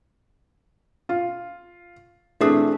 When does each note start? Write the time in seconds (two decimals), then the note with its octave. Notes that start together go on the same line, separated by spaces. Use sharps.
1.09 F4
2.41 E3 A3 C4 D4 G#4 E5